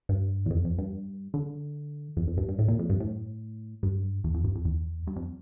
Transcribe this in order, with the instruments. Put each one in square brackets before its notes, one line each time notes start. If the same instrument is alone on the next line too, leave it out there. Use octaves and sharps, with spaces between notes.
[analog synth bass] G2
E2
F2
F2
G2
D3
F2
F2
G2
G2
A2
A#2
F2
G2
A2
G2
E2
F2
G2
F2
E2
G2
F2